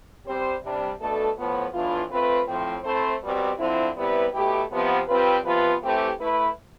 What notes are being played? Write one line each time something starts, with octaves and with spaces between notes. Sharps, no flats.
G3 C4 G4 C5
C3 G3 D4
B2 A3 D4 A4
A2 F3 B3
A2 E3 B3 D4 F4
A3 C4 F4 B4
A2 F3 C4
A3 C4 E4 A4 C5
B2 G3 C4 G4
D3 F3 C4 E4
C3 G3 B3 E4 B4
B2 A3 E4 G4
C3 F3 B3
C3 G3 C4 F4 B4
C3 F3 B3 F4 B4
E3 A3 C4 E4 G4
A3 E4 B4